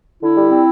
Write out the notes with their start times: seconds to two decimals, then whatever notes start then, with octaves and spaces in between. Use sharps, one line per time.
0.22 D3 E4
0.36 G3
0.50 C4